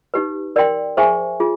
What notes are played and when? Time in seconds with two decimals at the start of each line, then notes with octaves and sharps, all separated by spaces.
0.14 D#4 G4 B4
0.56 A#4 D5 G5 C6
0.97 G#4 C5 E5 G#5 C#6
1.40 F4 G#4